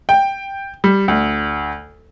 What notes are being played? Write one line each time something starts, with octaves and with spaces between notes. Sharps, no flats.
G5
G3
D2